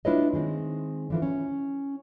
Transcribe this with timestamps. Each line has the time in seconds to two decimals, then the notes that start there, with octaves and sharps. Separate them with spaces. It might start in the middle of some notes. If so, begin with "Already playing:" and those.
0.05 D4 E4 F4 B4 C#5 D#5
0.33 D#3 G#3 C4
1.10 D3 E3 F3
1.22 C#4